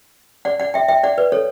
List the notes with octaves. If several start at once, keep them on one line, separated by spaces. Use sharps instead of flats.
D5 F#5
D5 F#5
E5 G5
E5 G5
D5 F#5
B4 D5
A4 C#5